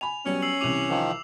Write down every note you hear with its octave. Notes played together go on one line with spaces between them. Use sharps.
G#5 B5 F7
F#3 G3 B3 C#4
E6 C7 F#7
C2 E3 D6 D#7 F7
D#3 F3